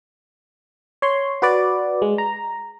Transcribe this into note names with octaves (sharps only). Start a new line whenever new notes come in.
C#5 C6
F#4 B4 D5
G#3
A#5